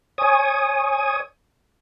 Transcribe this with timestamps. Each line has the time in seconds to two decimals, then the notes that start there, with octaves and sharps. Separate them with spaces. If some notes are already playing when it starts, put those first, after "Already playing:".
0.18 C#5 G#5 D#6